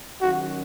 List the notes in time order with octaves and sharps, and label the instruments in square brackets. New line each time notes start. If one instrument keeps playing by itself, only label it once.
[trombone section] D#3 F#3 C#4 [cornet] F#4